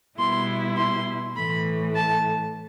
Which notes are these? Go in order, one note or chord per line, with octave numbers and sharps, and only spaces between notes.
B2 G3 B3 E4 C6
C6
A2 E3 A3 B5
A5